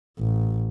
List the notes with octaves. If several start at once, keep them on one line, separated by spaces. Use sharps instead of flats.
A1